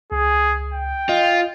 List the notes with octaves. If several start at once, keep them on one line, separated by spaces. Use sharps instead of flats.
C#2 G#4
G5
F4 D#5